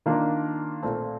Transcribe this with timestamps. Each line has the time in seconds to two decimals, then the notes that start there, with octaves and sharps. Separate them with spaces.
0.06 D#3 A#3 D4 F4
0.83 A#2 A3 C4